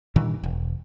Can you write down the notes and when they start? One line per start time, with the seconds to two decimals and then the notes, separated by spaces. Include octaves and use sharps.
0.16 G2 A#2 D#3 E3
0.44 E1